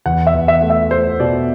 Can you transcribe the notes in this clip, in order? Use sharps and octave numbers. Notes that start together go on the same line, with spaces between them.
E2 F#5
E5
E2
E5
A3
E5
A3 C5
B2 D5